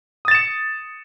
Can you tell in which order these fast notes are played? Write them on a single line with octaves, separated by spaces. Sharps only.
D#6 A6 E7 C#7